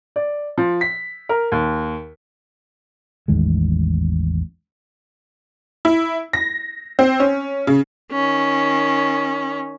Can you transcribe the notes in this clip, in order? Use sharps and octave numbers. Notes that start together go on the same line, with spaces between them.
D5
F3
B6
A#4
D#2
A1 E2 D#3 G#3
E4
A#6
C4
C#4
C#3
D#3 C#4